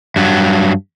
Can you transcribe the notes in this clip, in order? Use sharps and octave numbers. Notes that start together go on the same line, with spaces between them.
G2 F#3